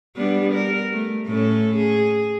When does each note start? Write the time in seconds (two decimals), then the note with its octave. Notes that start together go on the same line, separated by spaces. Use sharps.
0.16 G3 B3 D4
0.54 A#4
0.92 A3
1.26 A2 C#4 A4
1.76 G#4